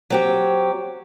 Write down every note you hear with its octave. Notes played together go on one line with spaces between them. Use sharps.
F#3 C4 G4